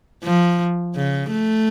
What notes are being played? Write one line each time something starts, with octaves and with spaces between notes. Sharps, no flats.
F3
C#3
A3